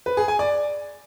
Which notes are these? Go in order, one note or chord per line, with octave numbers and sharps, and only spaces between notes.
B4
G#4
G#5
D5